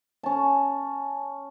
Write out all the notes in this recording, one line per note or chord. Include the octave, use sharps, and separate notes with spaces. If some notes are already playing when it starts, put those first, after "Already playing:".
C#4 A5